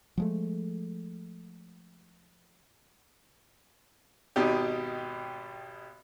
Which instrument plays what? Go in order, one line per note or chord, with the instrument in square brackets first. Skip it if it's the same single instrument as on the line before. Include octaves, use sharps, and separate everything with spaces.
[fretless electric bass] F3 G#3 A3
[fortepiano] G#1 B2 D#4 G4